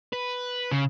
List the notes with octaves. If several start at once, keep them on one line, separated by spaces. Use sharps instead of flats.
B4
C#3